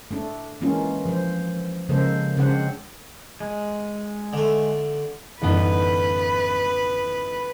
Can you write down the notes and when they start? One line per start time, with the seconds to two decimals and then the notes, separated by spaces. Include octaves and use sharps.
0.11 A3 D4
0.61 E3 G#3 A#3 C#4 D4 F4
1.05 F3 C5
1.89 C#3 F3 G#3 A#3 A4 C5
2.37 C#3 G#3 C4 D4 C5 F#5
3.40 G#3
4.33 D3 A3
5.42 A1 F#2 D3 G3 B3 D#4 B4